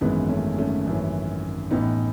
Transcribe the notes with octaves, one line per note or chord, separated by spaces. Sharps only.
G#1 F#2 E3 G#3 B3
A3 C#4
A3 C#4
G#1 F#2 E3
A1 A2 E3 B3 D#4